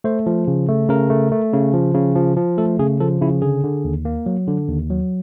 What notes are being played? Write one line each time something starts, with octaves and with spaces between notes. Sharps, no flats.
A3 C5
F3
C#3
A3
C#3 A#4
A3
A3
C#3
F3
C#3
F3
F3
A3 A4
C#3 G#4
F3 A4
C#3 E4
D3 G#4
D3
D#2
A#3
F#3
D3
D#2
F#3